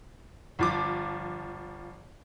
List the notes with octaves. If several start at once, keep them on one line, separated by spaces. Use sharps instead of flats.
G1 F3 D6